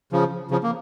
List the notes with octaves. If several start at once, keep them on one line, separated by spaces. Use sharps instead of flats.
C#3 F3
C#3 F3
A#3